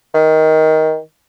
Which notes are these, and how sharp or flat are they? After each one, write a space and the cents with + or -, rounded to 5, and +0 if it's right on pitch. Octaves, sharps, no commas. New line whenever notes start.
D#3 +15